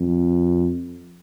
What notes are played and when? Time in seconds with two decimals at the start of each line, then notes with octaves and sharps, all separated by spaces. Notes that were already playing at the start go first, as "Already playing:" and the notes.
Already playing: F2